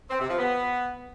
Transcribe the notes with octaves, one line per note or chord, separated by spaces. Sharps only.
C4
C3
F3
B3